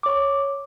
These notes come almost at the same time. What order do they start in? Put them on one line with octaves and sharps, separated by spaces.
D6 C#5 C#6